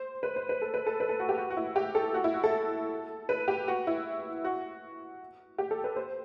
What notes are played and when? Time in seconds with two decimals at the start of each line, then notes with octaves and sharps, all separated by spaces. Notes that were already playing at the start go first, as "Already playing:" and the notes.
Already playing: C5
0.23 B4
0.36 C5
0.49 B4
0.62 A4
0.74 B4
0.86 A4
1.00 B4
1.09 A4
1.20 F#4
1.29 G4
1.37 F#4
1.50 F#4
1.57 E4
1.76 G4
1.95 A4
2.14 F#4
2.24 E4
2.34 F#4
2.44 A4
3.29 B4
3.48 G4
3.68 F#4
3.87 E4
4.44 F#4
5.58 G4
5.71 A4
5.84 B4
5.96 C5